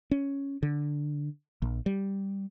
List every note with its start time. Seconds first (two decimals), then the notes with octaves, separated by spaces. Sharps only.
0.11 C#4
0.63 D3
1.62 A#1
1.86 G3